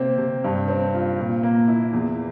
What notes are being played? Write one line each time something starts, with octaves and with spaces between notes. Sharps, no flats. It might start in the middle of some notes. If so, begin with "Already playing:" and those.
Already playing: C3 A#3 C4
C3
G2
C4
F4
A#2
A#3
E4
E2